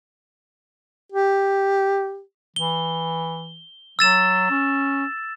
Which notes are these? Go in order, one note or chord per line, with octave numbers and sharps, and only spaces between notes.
G4
E3 G7
F#3 E6 A6 E7
C#4